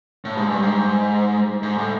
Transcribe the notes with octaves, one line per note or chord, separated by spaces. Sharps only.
A2
G#2
G2
G#2
G#2
A2